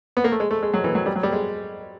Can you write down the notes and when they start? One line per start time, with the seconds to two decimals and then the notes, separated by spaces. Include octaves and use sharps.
0.17 B3
0.24 A#3
0.32 A3
0.40 G#3
0.51 A3
0.63 G#3
0.74 F#3
0.84 E3
0.95 F#3
1.06 G3
1.16 F#3
1.23 G3
1.32 G#3